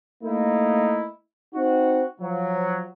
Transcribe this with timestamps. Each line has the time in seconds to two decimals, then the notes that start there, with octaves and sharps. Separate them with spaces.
0.24 A3 A#3 D#4 E4
1.55 C4 D#4 F#4
2.20 F3 F#3